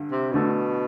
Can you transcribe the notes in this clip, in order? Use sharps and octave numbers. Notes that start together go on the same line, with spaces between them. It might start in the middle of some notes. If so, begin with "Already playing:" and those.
Already playing: G2 D3
C3
B2 D3 A3